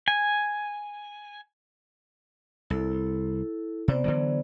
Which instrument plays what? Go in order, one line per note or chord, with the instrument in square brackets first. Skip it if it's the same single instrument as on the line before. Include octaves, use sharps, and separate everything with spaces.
[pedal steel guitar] G#5
[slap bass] C2 [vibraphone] E4 A4
[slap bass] C3 [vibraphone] B3 C5 D5
[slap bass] D3 E3 F#3